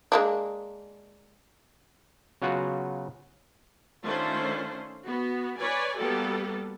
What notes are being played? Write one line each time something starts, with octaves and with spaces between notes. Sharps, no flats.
G#3 A#3 D4
C#3 F#3 B3 F4 F#4
D#3 A3 C#4 D4 F4 C5
B3 F#4
B4 C#5 D5 G#5
G3 A#3 B3 F#4 G4 A4